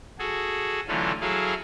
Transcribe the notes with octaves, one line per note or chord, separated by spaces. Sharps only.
F#4 G#4 A4
D3 E3 F#3 A3 C#4 F4
F#3 E4 G#4 A4 F5